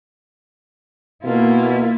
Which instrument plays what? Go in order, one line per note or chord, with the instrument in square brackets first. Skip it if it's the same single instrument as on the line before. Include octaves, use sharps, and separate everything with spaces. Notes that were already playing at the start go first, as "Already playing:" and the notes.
[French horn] B2 [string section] A#3 [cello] E4 F4